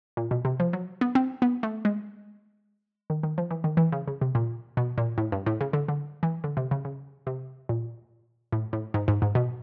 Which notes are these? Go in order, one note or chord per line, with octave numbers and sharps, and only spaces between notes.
A#2
B2
C3
F3
F#3
B3
C4
B3
A3
G#3
D#3
D#3
F3
E3
D#3
E3
C#3
C#3
C3
A#2
B2
A#2
A2
G2
A2
C#3
D3
D3
E3
D3
C3
C#3
C#3
C3
A#2
A2
A2
G#2
G#2
G#2
B2